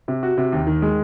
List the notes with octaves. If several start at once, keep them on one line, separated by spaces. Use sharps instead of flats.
C3
F#4
C3
D#2
D#3
G#3